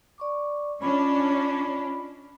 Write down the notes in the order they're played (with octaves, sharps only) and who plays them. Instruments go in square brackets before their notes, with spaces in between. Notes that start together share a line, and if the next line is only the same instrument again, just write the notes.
[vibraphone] D5 C#6 D6
[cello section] C#4 D4 [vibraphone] F4 D#5 B5